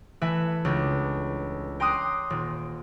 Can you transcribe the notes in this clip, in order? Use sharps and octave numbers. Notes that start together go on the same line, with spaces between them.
E3 A3 B4 E5 G#5 C#7
C#2 C#3 D4 F4 G6
G5 A#5 C6 D6 D#6 F#6
D#1